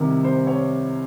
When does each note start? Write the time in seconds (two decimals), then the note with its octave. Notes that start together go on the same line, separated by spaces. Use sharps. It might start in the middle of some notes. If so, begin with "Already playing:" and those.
Already playing: C2 C3 D#3
0.24 C5
0.47 C#5